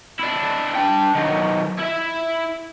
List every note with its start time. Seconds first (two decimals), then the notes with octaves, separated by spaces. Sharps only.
0.19 D4 E4
0.75 D4 G5
1.15 D#3 F#3
1.79 E4 E5